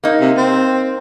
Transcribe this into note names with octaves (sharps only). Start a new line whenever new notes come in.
A#3 D#4
C3
C4